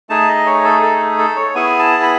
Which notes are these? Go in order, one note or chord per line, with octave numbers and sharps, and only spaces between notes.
A3 D#4 G#4 A5
D#5
C#5
A4
A4
A4
C#5
B3 E4 G#4 G#5
A5
B5